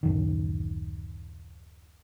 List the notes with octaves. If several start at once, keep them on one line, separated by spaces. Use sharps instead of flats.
D1 F#2 D#3